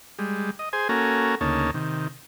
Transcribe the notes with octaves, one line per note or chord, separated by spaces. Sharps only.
G3 G#3
D#5
G#4 C5 G#5
A#3 C#4 F#4 A4 G#5 A#5
D2 C#3 A#3 D#4 C#5 A5
C3 D#3